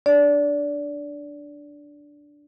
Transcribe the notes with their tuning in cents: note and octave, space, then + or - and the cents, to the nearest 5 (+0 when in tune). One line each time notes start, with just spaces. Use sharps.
D4 +0 D5 -25